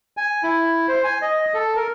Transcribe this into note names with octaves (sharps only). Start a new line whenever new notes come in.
G#5
E4
C5
G#5
D#5
A4
A#4